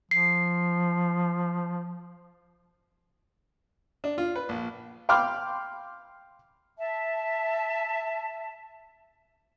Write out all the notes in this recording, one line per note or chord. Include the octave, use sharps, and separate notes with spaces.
F3 C7
D4
F4
B4
A#1
F5 G5 B5 C6 D6 F6
E5 A5